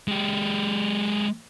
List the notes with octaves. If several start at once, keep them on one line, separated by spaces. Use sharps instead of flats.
G#3 G4